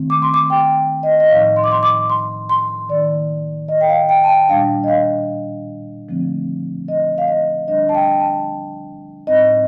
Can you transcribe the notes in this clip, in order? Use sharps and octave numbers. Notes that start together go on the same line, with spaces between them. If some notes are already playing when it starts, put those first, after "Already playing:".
Already playing: D#3 A3 C4
D6
C6
D6
G5
D#5
D#5
A2 F3 C4 D#4 F5
C6
D6
C6
D6
C6
C6
D#3 A#3 D#4 D5
D#5
G5
F5
G5
A5
G5
A#2 G3 D4 F5
D#5
F5
D3 F3 A3 C4
D#5
F5
D#5
D3 G3 D4 D#5
A5
G5
A5
A2 G3 C4 D#4 D#5